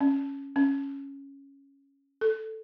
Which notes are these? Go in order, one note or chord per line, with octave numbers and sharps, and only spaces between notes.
C#4
C#4
A4